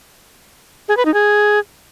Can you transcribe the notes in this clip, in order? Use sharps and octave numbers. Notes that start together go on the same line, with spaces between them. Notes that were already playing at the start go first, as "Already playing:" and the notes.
G#4
B4
D#4
G#4